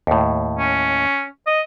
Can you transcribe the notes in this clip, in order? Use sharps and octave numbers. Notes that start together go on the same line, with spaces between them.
D#2 A2
C#4
D#5